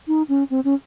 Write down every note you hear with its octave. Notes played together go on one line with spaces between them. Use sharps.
D#4
C#4
C4
C#4